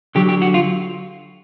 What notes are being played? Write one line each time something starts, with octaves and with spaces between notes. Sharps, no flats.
D3 F#3 G4
G4
F#4
F4